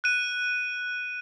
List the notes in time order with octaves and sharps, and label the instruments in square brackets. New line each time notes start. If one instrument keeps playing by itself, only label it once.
[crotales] F#6 D#7